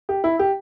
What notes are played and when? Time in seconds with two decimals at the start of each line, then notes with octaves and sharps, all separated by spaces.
0.09 G4
0.24 E4
0.39 G4